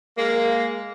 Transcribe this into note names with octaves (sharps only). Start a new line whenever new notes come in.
G#3 A#3